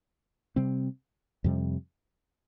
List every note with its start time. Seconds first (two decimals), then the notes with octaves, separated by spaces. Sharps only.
0.56 C3 G3 C4
1.44 F2 C3 G3